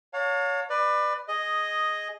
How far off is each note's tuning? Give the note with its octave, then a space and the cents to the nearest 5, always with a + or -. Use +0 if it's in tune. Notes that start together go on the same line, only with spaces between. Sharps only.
C#5 +20 F5 +45 A5 +40
B4 +10 D5 +25
G#4 +0 D#5 +0